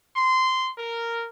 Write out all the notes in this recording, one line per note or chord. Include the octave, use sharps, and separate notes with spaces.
C6
A#4